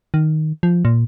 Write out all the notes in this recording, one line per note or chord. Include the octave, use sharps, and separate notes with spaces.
D#3
F3
A#2